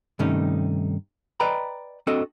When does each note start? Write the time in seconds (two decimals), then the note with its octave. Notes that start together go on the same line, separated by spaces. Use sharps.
0.19 G2 C3 D#3 A3 C#4 D#4
1.40 B4 D5 D#5 G5 A#5 B5
2.07 C4 D4 F#4 A4 D#5